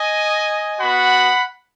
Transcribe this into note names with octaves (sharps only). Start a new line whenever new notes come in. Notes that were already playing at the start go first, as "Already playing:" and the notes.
Already playing: D#5 G#5
B3 F#4 F#5 B5